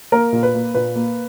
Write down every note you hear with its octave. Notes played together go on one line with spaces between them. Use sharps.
A#3 A#4
A#2
B4
A#3
A#2 B4
A#3